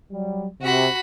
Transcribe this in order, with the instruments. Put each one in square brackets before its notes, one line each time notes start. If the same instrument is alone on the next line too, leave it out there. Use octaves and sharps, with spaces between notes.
[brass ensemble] F#3 G3
[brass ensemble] C3 [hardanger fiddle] F#4 B5